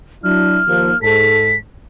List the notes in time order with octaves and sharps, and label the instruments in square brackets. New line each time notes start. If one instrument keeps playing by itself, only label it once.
[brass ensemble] F#3 D4 E4 [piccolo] F6
[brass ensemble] D#2 F3 A#3
[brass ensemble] G#2 A4 [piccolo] B6